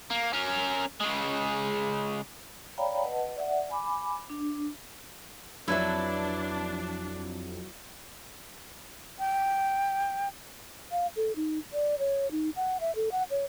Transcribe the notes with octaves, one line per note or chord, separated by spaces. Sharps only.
A#3
C#4 A#4
C#3 G#3
C#5 D5 F5 G5 A#5 B5
B4 D#5 F#5 A5
D5 E5 F#5
G#5 B5 D6
D4
F2 F#3 D4 E4 B4 E5
G5
F5
A4
D#4
D5
C#5
D#4
F#5
E5
A4
F#5
C#5